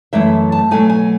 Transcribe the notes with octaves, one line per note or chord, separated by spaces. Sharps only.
F#2 E3 A3 E5
A5
B2 F#3 A3 G#5
G#5